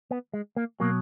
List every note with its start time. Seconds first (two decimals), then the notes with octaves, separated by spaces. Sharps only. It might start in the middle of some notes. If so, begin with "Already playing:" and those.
0.11 B3
0.34 G#3
0.56 A#3
0.80 B2 F#3 A#3